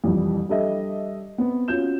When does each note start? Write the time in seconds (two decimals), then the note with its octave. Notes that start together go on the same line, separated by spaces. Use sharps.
0.04 C2 F2 E3 G3
0.49 G3 D4 G4 A4 D#5 E5
1.38 B3 C4
1.68 C#4 F4 F#4 G6 E7